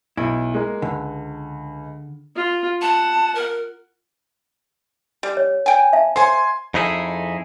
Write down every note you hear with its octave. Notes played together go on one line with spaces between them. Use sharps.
B1 E4
G#3 A#3
C#2 D3
F4
F#5 A5
A#4
G3
C#5
G5 G#5
E5 F5 A5
C5 C#5 G#5 C6
F2 D#4 E4 G#4 A4